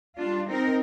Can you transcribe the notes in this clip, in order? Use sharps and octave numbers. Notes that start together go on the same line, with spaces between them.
G3 D4 F4
C4 D#4 A#4